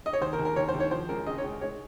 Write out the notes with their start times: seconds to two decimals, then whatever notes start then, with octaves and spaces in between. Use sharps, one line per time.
0.06 D#5
0.13 C#5
0.21 D#2 C5
0.33 A#4
0.39 D#2
0.45 A#4
0.56 D#2 C#5
0.68 C5
0.74 D#2
0.80 C#5
0.91 F3 C5
1.09 C#2 A#4
1.26 C#3 D#5
1.38 C#5
1.44 C#2
1.61 G#3 C#5